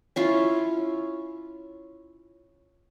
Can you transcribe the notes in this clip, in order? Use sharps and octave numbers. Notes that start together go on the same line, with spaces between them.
C#4 E4 F4